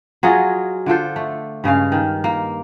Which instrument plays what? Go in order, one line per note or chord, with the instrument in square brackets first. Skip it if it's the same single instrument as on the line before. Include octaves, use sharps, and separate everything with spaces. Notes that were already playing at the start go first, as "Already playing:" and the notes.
[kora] F#3 F4 G#4 D#5
D3 F4 A4 C5
A3
G2 C#3 G#3 F5
D#3
A#3